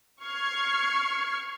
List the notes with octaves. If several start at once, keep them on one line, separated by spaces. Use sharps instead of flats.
C#6 F6 G#6 C7 C#7